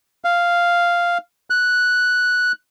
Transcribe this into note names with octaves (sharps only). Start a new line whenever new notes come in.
F5
F#6